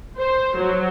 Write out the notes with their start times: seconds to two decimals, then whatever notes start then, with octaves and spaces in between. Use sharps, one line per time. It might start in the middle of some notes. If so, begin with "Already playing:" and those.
0.18 C5
0.58 F#3